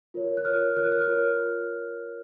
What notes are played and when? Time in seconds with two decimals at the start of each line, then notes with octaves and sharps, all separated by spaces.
0.14 F4 A#4 C#5
0.37 F#6
0.45 F4 A#4 C#5 F6
0.76 F4 A#4 C#5 F#6
0.92 F6
1.08 F4 A#4 C#5